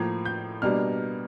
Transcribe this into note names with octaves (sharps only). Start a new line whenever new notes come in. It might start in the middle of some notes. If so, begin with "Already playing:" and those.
Already playing: A2 F3 A#3 G#6
G6
B2 G3 A#3 D4 F6